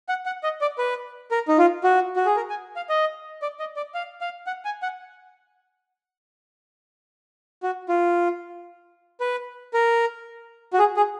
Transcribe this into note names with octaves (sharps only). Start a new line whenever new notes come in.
F#5
F#5
D#5
D5
B4
A#4
D#4
F4
F#4
F#4
G#4
A#4
G#5
F5
D#5
D5
D#5
D5
F5
F5
F#5
G#5
F#5
F#4
F4
B4
A#4
F#4
G#4
G#4